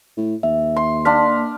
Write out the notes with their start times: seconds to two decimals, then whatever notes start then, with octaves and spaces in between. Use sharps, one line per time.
0.17 A2
0.43 D#2 E5
0.76 C6
1.05 A#3 D4 F5 C6 B6